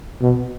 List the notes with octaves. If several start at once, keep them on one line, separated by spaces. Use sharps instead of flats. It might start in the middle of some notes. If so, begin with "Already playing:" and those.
B2